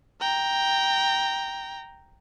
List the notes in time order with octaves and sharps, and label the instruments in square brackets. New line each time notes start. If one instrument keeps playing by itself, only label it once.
[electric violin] G5 A#5